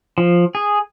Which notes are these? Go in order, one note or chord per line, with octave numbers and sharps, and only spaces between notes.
F3
G#4